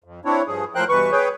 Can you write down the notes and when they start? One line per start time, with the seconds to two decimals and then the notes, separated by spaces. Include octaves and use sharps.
0.04 F2
0.25 C4 D4 E4 C#5
0.47 G2 F3 G#4
0.75 A2 F3 A#4 C5 G5 F#6
0.89 G2 B2 E3 B4 C#6
1.12 G#4 B4 C#5 G5